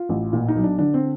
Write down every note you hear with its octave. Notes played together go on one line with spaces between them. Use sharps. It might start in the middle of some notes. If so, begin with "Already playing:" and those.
Already playing: F4
A1
A#2
D#4
B1
D4
D3 D4
C4